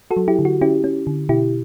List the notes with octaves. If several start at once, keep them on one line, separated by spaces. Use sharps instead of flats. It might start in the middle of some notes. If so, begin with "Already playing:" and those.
F#4 A4
F#3
E4 G4
D3
F#4
C#4 E4 G4
C#4
D3
B2 E4 G4